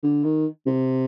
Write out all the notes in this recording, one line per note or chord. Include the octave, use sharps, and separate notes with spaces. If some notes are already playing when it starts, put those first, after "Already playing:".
D3
D#3
C3